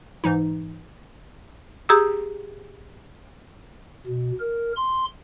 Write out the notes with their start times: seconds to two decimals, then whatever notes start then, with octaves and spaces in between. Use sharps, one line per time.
0.24 G#2 E3 D#4
1.89 G4 G#4 A#5 D#6 E6
4.07 B2
4.40 A#4
4.76 C6